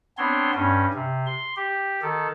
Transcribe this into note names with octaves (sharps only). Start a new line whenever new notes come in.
B3 C4 D4 C#5 C6
G2 C#4
C3
C6
G4
D#3 A4